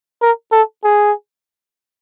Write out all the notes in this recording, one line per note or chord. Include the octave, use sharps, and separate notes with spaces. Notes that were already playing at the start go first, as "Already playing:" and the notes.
A#4
A4
G#4